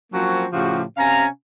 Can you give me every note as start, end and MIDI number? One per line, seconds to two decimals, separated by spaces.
0.13 0.45 53
0.13 0.45 54
0.13 0.45 58
0.13 0.45 60
0.13 0.45 61
0.13 0.45 66
0.53 0.82 45
0.53 0.82 49
0.53 0.82 53
0.53 0.82 66
0.53 0.82 67
0.97 1.26 48
0.97 1.26 61
0.97 1.26 77
0.97 1.26 80
0.97 1.26 82